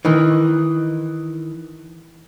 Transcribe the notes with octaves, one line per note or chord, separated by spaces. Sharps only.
D#3 E3